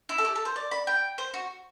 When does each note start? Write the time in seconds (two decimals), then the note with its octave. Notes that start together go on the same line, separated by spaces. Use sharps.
0.09 E4
0.18 A4
0.25 G4
0.36 A4
0.45 C5
0.56 D5
0.71 B5
0.87 G5
1.18 C5
1.34 F#4